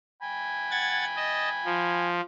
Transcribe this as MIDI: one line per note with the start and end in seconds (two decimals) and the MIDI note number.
0.22 2.07 79
0.22 2.07 80
0.22 2.07 83
0.71 1.05 78
0.71 1.05 92
0.71 1.05 93
1.16 1.49 75
1.16 1.49 81
1.65 2.21 53